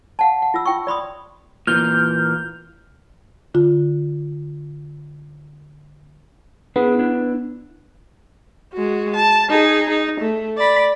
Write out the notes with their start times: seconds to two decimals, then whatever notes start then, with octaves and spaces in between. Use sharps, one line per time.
0.19 F5 F#5 A5
0.42 F#5
0.54 F4 E6
0.66 F4 G5 C#6
0.87 D5 B5 C6 D#6
1.67 A#2 E3 A#3 F6 G6
3.54 D3 F4
6.76 B3 D4 E4 G#4
6.99 D4 E4
8.74 G#3 F#4
9.16 A5
9.50 D#4 G#4
9.90 D#4
10.20 A3
10.57 D5 B5